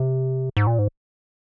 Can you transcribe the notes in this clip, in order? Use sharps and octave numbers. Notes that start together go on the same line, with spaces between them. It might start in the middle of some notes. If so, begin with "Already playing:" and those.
Already playing: C3
G#2
A#2
G#2